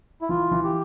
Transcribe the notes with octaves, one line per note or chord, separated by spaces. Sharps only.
E4
E3 F4
E3
G4